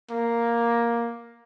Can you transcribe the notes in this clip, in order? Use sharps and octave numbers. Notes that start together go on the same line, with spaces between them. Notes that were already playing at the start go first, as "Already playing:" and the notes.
A#3